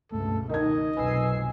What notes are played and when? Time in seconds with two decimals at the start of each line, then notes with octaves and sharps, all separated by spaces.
0.12 C#2 G2 B2 A3 A4
0.49 D#3 D#4 D#5 G#6
0.97 F1 B1 F2 B4 G#5 E6 C7